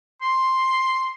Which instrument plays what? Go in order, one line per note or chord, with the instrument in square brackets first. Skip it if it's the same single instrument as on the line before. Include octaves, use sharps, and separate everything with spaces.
[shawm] C6